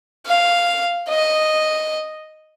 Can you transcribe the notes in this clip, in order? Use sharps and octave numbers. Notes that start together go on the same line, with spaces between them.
F5
D#5